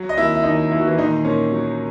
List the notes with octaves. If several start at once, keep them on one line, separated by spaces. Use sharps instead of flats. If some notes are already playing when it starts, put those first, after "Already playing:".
Already playing: F#3
D#5
D#2 E4 E5
E5
D#2 D#4 D#5
D#2 E4
F#4
E3 E4
A#2 D#3 D#4
A#2 C#4
F#3